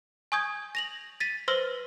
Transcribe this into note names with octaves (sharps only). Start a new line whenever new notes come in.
G#5 C#6 D#6 G6 G#6
A#6 F7 F#7
A6 B6 D#7
B4 C5 C6 E6 F6 A#6